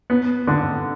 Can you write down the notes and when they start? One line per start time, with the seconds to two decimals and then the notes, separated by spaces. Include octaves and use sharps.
0.10 B3
0.47 D3